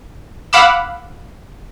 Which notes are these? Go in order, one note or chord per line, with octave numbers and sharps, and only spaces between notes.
F5 F#5 B5 D6 E6